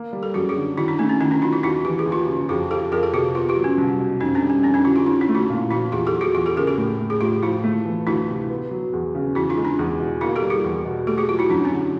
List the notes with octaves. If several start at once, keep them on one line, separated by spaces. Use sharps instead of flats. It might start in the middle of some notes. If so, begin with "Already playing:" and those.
Already playing: A#3
G3
A4
F#2 F#4 G#4
F#4 G#4
D3
D#3 E4 F#4
D4 E4
A3 C#4 D#4
C4 D4
D#3 C#4 D#4
D4 E4
F#3 D#4 F4
E4 F#4
D#2 E4 F#4
E3 G4
G#4
D#2
F4 G4
C#3
F2 F#4 G#4
F3 G4 A4
F2 G#4 A#4
G4 A4
C3 F#4 G#4
B3 F4 G4
F4 G4
F#3
C#4
C2
B2
F2 C#4 D#4
C4 D4
G3
C#4
F2 C4 D4
C#4 D#4
D3 E4 F#4
F4 G4
C#4 D#4 F4
D4 E4
A3
E4 F#4
A#2
F3 E4 F#4
E2 F4 G4
G4 A4
F#3
F#4 G#4
E2 F4 G4
G4 A4
C#3 G#4 A#4
G4 A4
A2
A3
G#4
A2 F4 G4
F3 E4 F#4
A3
E3
D2 E4 F#4
C3
B3
F#3
E2
C#3
E2 E4 F#4
D#4 F4
G#3
D4 E4
E2
B2
A#3 E4 F#4
G4 A4
G3
F#4 G#4
E2
B2
A3 G4 A4
F#4 G#4
F#3 F4 G4
E4 F#4
F#2 D4 E4
C4 D4
D3